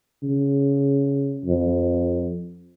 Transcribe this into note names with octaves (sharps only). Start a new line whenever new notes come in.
C#3
F2